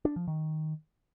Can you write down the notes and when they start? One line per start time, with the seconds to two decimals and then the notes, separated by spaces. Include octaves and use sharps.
0.05 D4
0.16 F3
0.27 D#3